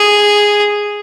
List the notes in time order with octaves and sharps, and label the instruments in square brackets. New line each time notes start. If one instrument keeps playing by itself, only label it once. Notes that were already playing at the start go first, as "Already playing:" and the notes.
Already playing: [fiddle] G#4